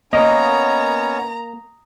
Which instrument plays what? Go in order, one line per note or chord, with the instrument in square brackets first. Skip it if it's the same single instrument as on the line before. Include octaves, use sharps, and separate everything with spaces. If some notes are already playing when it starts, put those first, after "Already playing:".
[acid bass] A#3 [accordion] B3 C#4 C#5 [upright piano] D#5 [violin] A#5